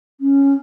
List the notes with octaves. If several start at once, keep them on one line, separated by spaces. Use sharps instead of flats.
C#4